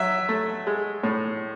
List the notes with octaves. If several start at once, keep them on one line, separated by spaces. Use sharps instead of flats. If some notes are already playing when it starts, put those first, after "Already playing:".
Already playing: F#3 E5
A3
G#3
A2